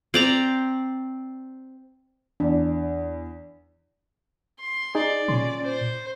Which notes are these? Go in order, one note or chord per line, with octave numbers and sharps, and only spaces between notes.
C4 D5 A#5
E2 D4
C6
D#4 G#4 D5
A#2 C#4 C6
C5